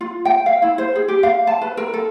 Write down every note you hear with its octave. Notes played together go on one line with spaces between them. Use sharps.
F4
G5
F5
E4
C5
G#4
G4
F5
A5
B4
A#4
A4